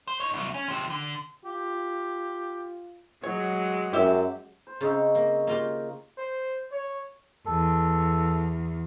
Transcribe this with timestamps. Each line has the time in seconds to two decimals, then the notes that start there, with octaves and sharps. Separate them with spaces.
0.08 C5
0.20 D#4 C#5
0.34 C2 F#3
0.54 C#4
0.68 F3 G4
0.90 D3
1.45 F4 G4
3.23 F#3 G#3 C#5
3.93 F#2 G4 E5
4.67 C5
4.81 C#3 C4 D#4 C#5
5.15 A#3
5.47 A#3 F4 G4
6.18 C5
6.72 C#5
7.46 E2 A4